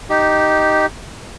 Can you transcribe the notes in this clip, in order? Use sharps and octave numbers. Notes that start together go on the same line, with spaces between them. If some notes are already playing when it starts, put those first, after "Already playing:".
D#4 G4